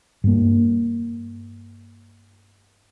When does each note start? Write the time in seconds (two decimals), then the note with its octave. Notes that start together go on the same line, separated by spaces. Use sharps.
0.24 G2 A#3